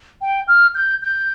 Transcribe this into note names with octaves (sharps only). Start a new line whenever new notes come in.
G5
F6
G6
G6